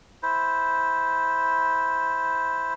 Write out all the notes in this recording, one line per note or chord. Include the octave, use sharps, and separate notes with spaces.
E4 C5